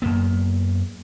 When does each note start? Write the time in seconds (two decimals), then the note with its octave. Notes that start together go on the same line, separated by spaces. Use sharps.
0.02 F#2 A#3 B3